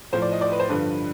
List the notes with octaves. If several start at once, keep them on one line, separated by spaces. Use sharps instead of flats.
A2 F3 C5
D5
D#5
D5
B4
C5
G2 D3 F3 B4